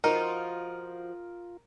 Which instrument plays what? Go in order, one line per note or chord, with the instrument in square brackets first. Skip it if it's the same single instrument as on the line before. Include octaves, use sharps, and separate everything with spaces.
[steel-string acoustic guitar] F3 F#4 [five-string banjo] D#4 [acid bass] F4 [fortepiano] A#4